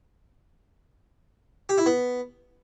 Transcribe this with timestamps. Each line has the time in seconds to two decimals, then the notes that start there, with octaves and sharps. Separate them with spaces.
1.69 G4
1.78 E4
1.86 B3